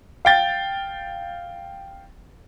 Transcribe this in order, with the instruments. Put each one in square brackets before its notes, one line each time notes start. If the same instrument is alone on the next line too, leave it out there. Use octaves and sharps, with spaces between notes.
[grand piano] F5 G5 A6